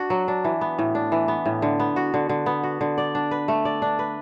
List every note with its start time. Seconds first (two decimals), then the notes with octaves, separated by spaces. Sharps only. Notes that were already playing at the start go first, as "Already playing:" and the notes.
Already playing: D4 F#4
0.10 F#3
0.28 D4
0.44 E3
0.61 B3
0.79 A2
0.95 D4
1.12 E3
1.28 B3
1.46 A2
1.62 D3
1.80 B3
1.96 F#4
2.14 D3
2.29 D3
2.46 B3
2.63 F#4
2.81 D3
2.98 D5
3.15 D4
3.31 B4
3.48 A3
3.65 D5
3.82 D4
3.99 B4